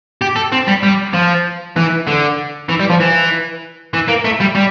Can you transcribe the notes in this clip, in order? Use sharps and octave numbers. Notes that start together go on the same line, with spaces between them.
G4
A4
C4
G3
G3
F3
E3
D3
E3
G3
F3
E3
E3
A#3
A3
G3
G3